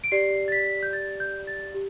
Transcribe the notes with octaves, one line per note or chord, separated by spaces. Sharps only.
D7
G4 D5 C7
A6
B6
G6
A6
G6
A6
G4